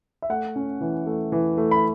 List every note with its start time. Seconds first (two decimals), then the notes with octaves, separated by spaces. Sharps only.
0.22 E5
0.29 A3 F#5
0.56 C#4
0.81 E3
1.06 A3
1.32 E3
1.57 A3
1.71 B5